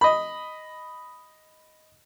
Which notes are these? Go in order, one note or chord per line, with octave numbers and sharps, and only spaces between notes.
D#5 B5